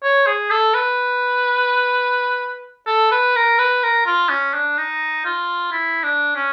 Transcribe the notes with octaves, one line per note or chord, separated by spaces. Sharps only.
C#5
G#4
A4
B4
A4
B4
A#4
B4
A#4
F4
C#4
D4
D#4
F4
E4
D4
C#4